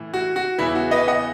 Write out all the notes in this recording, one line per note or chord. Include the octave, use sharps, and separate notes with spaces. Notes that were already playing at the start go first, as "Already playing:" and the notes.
Already playing: A2 E3
F#4
F#4
E2 C#3 E3 B3 E4
F#4
B4 D#5
D#5 F#5